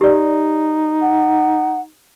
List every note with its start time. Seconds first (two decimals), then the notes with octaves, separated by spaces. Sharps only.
0.01 D#4 G4 D5
1.02 F#5